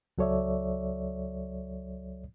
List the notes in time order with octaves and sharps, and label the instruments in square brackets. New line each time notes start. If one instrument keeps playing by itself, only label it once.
[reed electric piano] C#2 F#3 A4 C#5 D5 E5